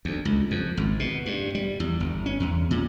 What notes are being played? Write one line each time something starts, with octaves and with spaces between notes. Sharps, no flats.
D2
C#2
F2
G#1
B2
G2
G3
E2
G1
C#4
E2
A#2